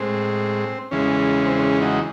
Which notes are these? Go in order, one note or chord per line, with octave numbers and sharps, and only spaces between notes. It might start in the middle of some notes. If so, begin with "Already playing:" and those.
Already playing: A2 G#3 C4
E2 C#3 E3 G#3 C#4
C4
C#4
D#4 F#4